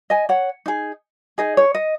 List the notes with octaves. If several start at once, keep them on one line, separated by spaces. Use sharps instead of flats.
D#5 G#5
C#5 F#5
D#4 G#4
D#4 G#4 D#5
C#5
D#5